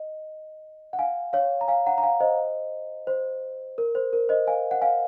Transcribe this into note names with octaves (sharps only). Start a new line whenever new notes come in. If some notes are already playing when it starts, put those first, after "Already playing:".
Already playing: D#5
F#5
F5 G#5
C#5 F5
A#5
F5 G#5
F#5 A#5
A#5
F5 G#5
C5 D#5
C5
A#4
C5
A#4
C5 D#5
F5 G#5
F#5
F5 G#5